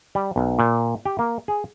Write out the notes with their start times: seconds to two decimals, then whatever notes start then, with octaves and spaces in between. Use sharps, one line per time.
0.15 G3
0.36 B1
0.59 A#2
1.05 G4
1.19 A#3
1.48 G#4